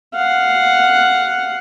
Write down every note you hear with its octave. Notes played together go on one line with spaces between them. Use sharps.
F5 F#5